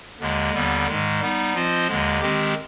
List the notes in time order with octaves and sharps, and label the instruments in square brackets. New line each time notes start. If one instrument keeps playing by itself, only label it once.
[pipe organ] D#2 D3 G#3
D#2 D3 G3 B3
G#2 D#3 G#3
G3 B3 D#4
F3 C4 F4 C5 D#5
D#2 D3 G#3
D#3 G#3 C4 G4